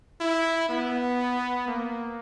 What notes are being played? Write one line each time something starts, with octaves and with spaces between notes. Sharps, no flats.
E4
B3
A#3